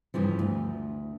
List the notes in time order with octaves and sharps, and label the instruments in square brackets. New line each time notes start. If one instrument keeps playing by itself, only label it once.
[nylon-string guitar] G2 C#3 E3 F3
D2